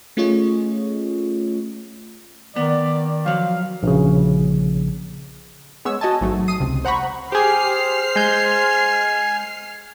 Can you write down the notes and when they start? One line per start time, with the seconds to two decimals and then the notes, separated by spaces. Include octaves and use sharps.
0.17 A3 C#4 F4 G#4 C#5 D#5
2.56 D#3 B3 D5
3.26 F3 F#3 F5
3.83 A#1 C#3
5.85 G#3 B3 C#5 E6
6.01 F#4 D#5 G#5 A5
6.21 A1 G#2 F#3 A3
6.48 D#6 C7 D#7
6.60 C#2 C3
6.85 C5 F#5 A#5 B5 C#6
7.32 G4 G#4 C5 F6 C7
8.16 G#3 G#5 G6